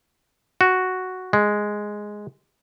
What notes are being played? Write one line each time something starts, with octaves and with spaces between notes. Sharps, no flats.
F#4
G#3